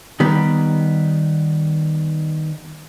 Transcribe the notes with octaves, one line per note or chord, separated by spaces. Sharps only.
D#3 G3 B3